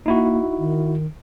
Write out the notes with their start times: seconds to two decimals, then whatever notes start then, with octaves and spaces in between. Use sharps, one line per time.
0.06 A#3 D#4 E4 F#4
0.59 D#3